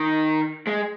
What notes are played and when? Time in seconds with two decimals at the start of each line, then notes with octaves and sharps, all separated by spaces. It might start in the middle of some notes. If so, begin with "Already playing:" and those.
Already playing: D#3
0.67 G#3